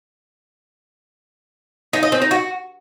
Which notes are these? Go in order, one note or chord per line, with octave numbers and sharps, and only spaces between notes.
D#4
D#5
C4
D#4
F#4